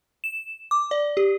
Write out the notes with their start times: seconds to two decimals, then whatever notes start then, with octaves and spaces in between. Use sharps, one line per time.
0.24 E7
0.71 D6
0.91 D5
1.17 G4